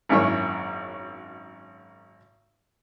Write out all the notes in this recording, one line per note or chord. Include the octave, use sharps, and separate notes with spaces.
G#1 F#2 A#3 E4 A#4 C#5